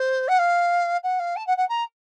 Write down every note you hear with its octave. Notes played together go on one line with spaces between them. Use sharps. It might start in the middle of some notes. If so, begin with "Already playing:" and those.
Already playing: C5
F#5
F5
F#5
F5
A5
F#5
F#5
A#5